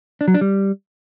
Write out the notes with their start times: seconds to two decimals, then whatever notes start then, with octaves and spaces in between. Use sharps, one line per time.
0.21 D4
0.28 F#3
0.34 D4
0.41 G3